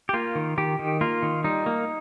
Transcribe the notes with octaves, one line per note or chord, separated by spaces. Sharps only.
G4
A#3 F4
D#3
D#3 G4
D#3
A#3 F4
D#3
G3 D#4
A#3